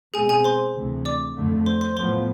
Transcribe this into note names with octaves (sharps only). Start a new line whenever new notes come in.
B2 G#3 C4 G#4 G#5
G#4 G#5
C5 C6
D2 C3 E3
D5 D6
F2 D3 A3
C5 C6
C5 C6
A2 F3 B3 C5 C6